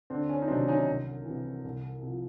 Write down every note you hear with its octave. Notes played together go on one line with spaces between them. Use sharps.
D2 C4 D4
C#4
D#4
C3 D#3 F#3 C4 D4
C#4 D#4
C2
C3 E3
C2
C3 F3